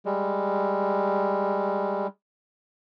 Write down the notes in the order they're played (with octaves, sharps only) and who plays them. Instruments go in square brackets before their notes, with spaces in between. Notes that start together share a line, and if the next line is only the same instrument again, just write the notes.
[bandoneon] G3 G#3